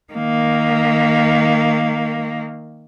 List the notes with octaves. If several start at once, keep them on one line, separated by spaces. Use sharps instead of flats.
D#3 A#3